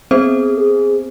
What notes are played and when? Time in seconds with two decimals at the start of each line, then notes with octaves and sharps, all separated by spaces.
0.11 B3 C4 G#4 C5
0.57 G#4